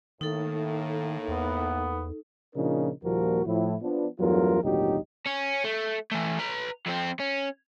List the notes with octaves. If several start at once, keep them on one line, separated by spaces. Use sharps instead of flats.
A2 D#3 A#3 D#4 A4
E2 B3
A#2 C#3 F3 D4 D#4 A#4
D#2 A#2 F3 G3 F#4 A#4
A2 F3 E4
F3 B3 D4
E2 G2 F#3 A3 F4 A#4
G#1 D2 A#2 F#3 D#4 G4
C#4
A3
E3 A3
B4 A#5
F2 C4
C#4